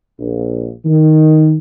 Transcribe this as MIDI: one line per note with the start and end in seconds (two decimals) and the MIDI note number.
0.19 0.69 34
0.85 1.56 51